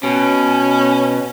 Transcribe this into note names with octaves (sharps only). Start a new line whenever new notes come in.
B2 C#4